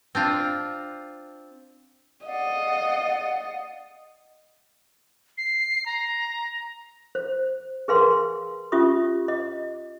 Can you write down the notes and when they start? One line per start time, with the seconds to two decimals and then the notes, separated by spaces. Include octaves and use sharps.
0.15 C4 D4 F4
2.26 D5 D#5 F5 F#5
5.38 C7
5.86 A#5
7.15 C5
7.88 G#4 A#4 B4 F5 G#5 C6
8.72 C#4 F4 G4 E5 D#6
9.28 D#5